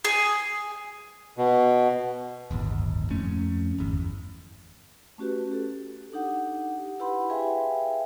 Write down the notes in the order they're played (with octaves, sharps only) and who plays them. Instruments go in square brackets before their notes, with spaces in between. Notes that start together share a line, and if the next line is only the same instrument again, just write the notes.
[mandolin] G#4
[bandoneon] B2
[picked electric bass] D1 G1 D#2
F2 A3 C#4
G1 E2
[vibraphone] A3 C#4 F#4 G4 B4
G4 A4
D4 D#4 G4 F#5
E4 G4 B4 F#5 B5 C6
G#4 B4 E5 F5 G5 G#5